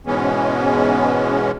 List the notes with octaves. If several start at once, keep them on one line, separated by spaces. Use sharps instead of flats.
G#2 B2 E3 G#3 B3 C#4